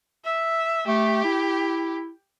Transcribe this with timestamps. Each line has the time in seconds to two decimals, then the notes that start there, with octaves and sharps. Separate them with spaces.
0.25 E5
0.88 A3 G4
1.25 E4